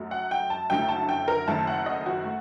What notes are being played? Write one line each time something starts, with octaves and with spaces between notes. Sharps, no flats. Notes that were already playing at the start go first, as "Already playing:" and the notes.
Already playing: F#2 F#3 A3
F#5
G5
A5
F#1 F#2 D3 F#3 A3 G5
A5
G5
A#4
F#1 F#2 D#3 A3 A5
F#5
D#5
F#4
A3